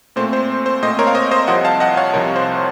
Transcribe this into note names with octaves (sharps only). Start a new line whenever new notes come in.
A#2 A3 C4 C5
C5
C5
A#2 A3 C4 C5 D#5
A#4 C#5
F5
C5 D#5
C5 D#5
C2 C3 F3 D#5 F#5
F5 A5
D#5 F#5
C#5 F5
C2 C3 F3 A#4 C#5
C5